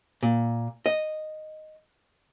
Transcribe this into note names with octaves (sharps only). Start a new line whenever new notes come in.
A#2
D#5